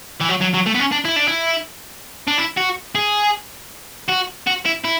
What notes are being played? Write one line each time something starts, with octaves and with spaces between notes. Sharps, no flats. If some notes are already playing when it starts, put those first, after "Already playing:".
E3
F#3
F#3
F#3
A3
B3
C#4
D4
E4
D4
E4
D4
E4
F#4
G#4
F#4
F#4
E4
E4